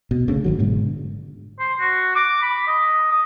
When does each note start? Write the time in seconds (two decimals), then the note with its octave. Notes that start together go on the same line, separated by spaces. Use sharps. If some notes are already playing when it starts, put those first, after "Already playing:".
0.11 B2
0.28 D2 C#3
0.44 G1 D#3 F#3
0.59 G#2 B2 D3 G#3
1.59 C5
1.80 F#4
2.15 D6
2.42 B5
2.67 D#5
3.11 D#6